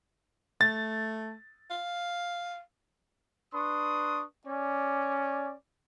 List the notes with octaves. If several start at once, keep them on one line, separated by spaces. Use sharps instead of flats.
A3 A6
F5
D4 B4 C6 C#6 D#6
C#4 D5